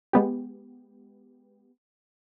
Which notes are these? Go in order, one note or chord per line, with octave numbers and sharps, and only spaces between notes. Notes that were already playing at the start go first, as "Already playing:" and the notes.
G#3 B3 G4